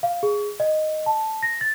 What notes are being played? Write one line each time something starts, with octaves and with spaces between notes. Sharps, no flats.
F5
G#4
D#5
A5
A#6
A6